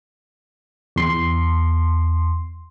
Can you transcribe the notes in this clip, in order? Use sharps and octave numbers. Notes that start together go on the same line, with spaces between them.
E2 C6